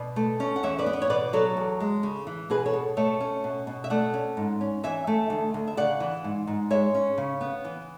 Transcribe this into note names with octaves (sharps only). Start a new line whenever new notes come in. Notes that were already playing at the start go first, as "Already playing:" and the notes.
Already playing: B2 B4 D5
A3
C#4
F#5
E2 C#5 E5
B4 D5
B3
B4
C#5
B2 B4 D5
F#3 A4 C#5
E2
G#3
C#3
E3
B2 G#4 B4
A4 C#5
B2
A3 C#5 E5
C#4
B2
B2
E5
A3 D5 F#5
C#4
G#2
C#4
E3 E5 G#5
A3
D2
D2
E5
C#3 D5 F#5
E3
G#2
G#2
G#3 C#5 E5
C#4
C#3
B3
E3